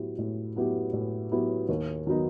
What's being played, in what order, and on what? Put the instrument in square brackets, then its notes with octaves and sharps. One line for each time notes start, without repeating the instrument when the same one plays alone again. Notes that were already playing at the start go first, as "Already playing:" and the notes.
Already playing: [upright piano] A2 F#3 B3 E4 G4
A2
F#3 B3 E4 G4
A2
F#3 B3 E4 G4
D#2
D#3 F#3 B3 D#4